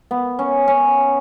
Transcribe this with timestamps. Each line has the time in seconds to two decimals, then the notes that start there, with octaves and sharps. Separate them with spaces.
0.11 B3
0.39 C#4
0.68 C#4